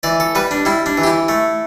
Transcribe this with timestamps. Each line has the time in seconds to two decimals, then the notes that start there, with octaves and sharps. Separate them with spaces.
0.03 E3 D5
0.20 A4
0.35 G3 B4
0.51 D4
0.65 G3 E4
0.86 D4
0.98 E3
1.03 G4
1.07 E4
1.29 A3